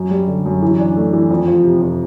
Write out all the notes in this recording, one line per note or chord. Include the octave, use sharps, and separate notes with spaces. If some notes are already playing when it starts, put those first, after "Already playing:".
Already playing: F#2
G3
D3
F#2
E3
D4
A3
E3
F2
F3
C3
F2